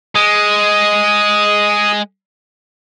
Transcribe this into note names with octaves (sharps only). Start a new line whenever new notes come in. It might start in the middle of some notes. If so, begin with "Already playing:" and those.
G#3 D#6